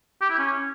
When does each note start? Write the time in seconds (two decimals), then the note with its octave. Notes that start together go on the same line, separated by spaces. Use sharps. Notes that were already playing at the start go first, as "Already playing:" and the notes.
0.21 G4
0.30 E4
0.38 C#4